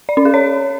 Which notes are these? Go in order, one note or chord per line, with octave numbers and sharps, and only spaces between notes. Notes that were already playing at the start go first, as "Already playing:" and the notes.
D5
C#4
G#4
C#5